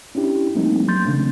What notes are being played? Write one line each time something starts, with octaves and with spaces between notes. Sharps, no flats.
C#4 D4 E4 G4
F3 G3 A3 A#3 C4 D#4
F#3 A#3 C6 G6 A6
C#3 E3 A3 C4 D4